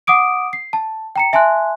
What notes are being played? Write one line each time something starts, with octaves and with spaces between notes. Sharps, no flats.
F#5 D6 D#6 D7
C7
A5
G5 A#5 C#7
E5 G#5 A5 C6 F#6